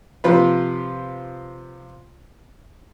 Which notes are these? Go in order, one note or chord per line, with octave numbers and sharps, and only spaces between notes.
C3 F3 F4 B4